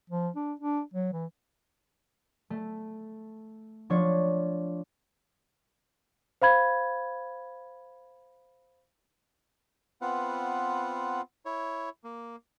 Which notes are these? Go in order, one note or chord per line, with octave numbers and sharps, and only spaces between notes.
F3
D4
D4
F#3
E3
A3
F3 D4 C#5
C5 F5 B5 G#6
B3 C4 F4 B4 F#5
E4 C#5
A#3